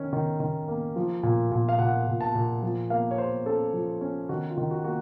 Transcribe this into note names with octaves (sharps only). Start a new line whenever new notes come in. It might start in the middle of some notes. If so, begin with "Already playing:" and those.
Already playing: D#3 C#4
D#3
D#3
A#3
F3
A#2
A#2
F5
A#2 F#5
A#2
A5
A#2
F3
A#3 F5
C#5
A#3 C5
C#4 A4
F3
C#4
D#3 F#4
F4
D#3
F#4
A#3 F#4